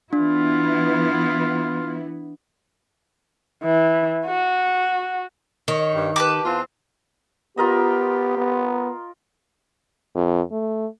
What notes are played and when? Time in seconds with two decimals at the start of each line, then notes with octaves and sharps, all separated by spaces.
0.13 E3 B3 D4 E4 F4
3.64 E3
4.26 F#4
5.68 D#3 C#5
5.95 G2
6.16 G4 B4 A5 D6
6.44 E2 C4 F4
7.57 B3 F4 G4 A#4 D#5
8.37 B3
10.15 F2
10.52 A3